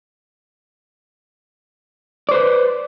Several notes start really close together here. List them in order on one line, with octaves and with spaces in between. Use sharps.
D5 C5 B4